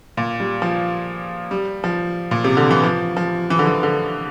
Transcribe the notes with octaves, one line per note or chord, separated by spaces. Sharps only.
A#2
G3
F3
G3
F3
A#2
C3
D3
E3
F3
F3
E3
D3
E3
D3